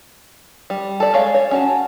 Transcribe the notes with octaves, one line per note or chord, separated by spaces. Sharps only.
G3
A4 D5
G#3 C#5 D5 F5
C#5
C#4 F#4 A5